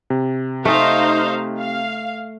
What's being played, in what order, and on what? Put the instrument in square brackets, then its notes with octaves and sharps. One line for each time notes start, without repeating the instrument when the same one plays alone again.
[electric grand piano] C3
[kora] A3 [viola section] D#4 C5 F5
[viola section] F5